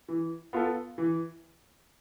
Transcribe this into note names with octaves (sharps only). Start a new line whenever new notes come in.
E3
B3 F4 A4
E3